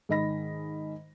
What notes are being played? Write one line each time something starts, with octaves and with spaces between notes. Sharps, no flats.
G#2 D#3 D#5 B5 A#6